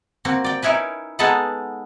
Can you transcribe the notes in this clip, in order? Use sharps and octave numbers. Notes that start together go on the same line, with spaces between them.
A#3 C4 F#4
D5 G5
C#4 D#4 E4 A#4 B4
G#3 B3 D#4 A4 B4 F#5